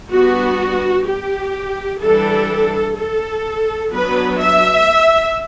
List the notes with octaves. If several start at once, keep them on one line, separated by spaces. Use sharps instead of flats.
G3 B3 D4 F#4
G4
E3 G3 D4 A4
A4
F#3 B3 D4 B4
E5